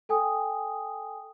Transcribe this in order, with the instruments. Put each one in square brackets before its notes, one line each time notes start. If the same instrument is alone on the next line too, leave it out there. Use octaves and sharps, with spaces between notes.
[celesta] A4 G5 G#5 D#6